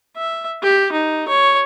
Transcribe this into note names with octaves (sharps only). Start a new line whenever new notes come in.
E5
G4
D#4
C#5